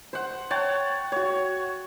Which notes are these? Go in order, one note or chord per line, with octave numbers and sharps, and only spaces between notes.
C5 F#5
C#5 F#5 G5 A5
F#4 C#5